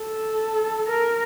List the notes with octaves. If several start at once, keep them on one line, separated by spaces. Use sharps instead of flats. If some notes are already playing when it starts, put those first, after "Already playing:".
Already playing: A4
A#4